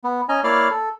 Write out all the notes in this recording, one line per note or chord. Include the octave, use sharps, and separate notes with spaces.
B3
C#4 D#5 G#5 A#5
A#3 E4 C#5 D5 F5 F6
A4